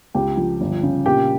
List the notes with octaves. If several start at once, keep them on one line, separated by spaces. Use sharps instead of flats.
C#2 G4 G5
F3
G1
C#3
A#2 G4 G5